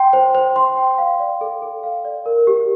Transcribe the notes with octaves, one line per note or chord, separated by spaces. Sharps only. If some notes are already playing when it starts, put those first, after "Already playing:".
Already playing: G5 C6
C5
C5
C6
G5
F5
D5
A4
A4
F5
D5
A#4
G4